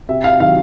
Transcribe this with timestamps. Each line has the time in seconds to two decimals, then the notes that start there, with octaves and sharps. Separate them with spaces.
0.09 C3 E5
0.24 F5
0.40 D#3 F#3 F5